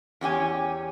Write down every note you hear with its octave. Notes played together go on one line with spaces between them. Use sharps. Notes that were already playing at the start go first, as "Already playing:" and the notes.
E2 C#4 G4 G#5